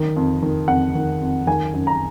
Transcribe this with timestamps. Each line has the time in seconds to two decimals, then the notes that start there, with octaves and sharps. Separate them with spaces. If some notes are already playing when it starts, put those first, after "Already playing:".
Already playing: D#3
0.16 F2
0.42 D#3
0.68 F2 F#5
0.95 D#3
1.22 F2
1.47 D#3 G#5
1.74 F#2
1.87 A#5